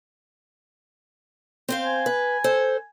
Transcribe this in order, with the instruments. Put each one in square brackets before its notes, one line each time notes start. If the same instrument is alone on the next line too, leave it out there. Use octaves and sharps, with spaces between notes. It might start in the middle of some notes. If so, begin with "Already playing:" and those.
[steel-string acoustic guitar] C4 C5 F5
[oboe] G#5
[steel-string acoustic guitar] B4
A4 C5